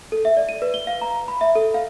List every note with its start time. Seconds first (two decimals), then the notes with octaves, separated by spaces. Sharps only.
0.12 A4
0.25 E5
0.37 D5
0.49 D#7
0.62 B4
0.74 G7
0.87 F5
1.01 A#5
1.28 B5
1.41 E5
1.55 A4
1.74 F5